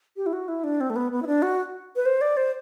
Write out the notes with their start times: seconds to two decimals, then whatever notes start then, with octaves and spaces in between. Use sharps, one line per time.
0.17 G4
0.26 E4
0.33 F#4
0.48 E4
0.64 D4
0.81 C4
0.90 A3
0.96 B3
1.12 B3
1.22 E4
1.27 D4
1.42 F#4
1.96 B4
2.06 C5
2.21 D5
2.37 C5